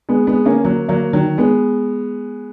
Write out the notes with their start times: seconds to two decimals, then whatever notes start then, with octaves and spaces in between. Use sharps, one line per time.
0.09 G#3 B3
0.27 G#3 B3
0.45 A#3 C#4
0.64 F#3 A#3
0.89 F#3 A#3
1.13 D#3 F#3
1.38 G#3 B3